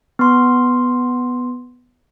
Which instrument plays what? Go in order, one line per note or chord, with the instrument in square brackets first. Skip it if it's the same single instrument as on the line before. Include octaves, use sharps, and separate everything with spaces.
[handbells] B3 C6